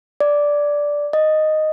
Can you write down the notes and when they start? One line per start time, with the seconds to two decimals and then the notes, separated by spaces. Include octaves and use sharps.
0.20 D5
1.13 D#5